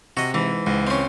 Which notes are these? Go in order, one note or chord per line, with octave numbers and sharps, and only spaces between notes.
C3 F#4 D#5
G#2 E3
C#2 G#2
C4 C#4